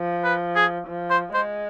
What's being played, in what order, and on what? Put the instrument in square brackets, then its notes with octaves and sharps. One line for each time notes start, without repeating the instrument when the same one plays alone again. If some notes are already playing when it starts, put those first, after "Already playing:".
Already playing: [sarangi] F3
[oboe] B4
G#4
[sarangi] F3
[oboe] C5
[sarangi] G#3 [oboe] C5